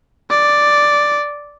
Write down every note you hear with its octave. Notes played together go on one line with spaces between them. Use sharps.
D5